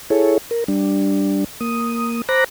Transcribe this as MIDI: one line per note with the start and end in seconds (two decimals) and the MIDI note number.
0.10 0.38 64
0.10 0.38 68
0.10 0.38 69
0.10 0.38 73
0.51 0.64 70
0.68 1.44 55
0.68 1.44 62
1.61 2.22 58
1.61 2.22 87
2.29 2.44 72
2.29 2.44 82
2.29 2.44 83
2.29 2.44 86
2.29 2.44 90
2.29 2.44 94